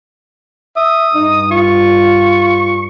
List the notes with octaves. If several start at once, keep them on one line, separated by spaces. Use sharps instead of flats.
E5 D#6
G2 D#4
F4 C#6